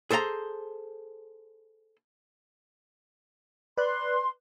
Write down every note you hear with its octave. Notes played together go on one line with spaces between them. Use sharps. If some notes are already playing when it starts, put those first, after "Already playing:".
G#4 A4 C5 E5 A#5
B4 D5 C6 F#6